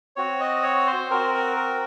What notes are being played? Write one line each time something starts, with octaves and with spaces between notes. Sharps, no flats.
C4 F#4 C#5
D#5
C#5
C5
C4 F#4 A#4
A#4
A#4